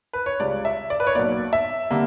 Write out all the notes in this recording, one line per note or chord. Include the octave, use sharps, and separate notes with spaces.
B4
C#5
C#2 C#3 G3 D5
E5
D5
B4
C#5
B1 B2 A#3 D5
E5
D3 G3 A#3